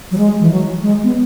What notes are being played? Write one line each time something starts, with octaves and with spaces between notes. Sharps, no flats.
F#3
G#3
E3
F#3
G#3
B3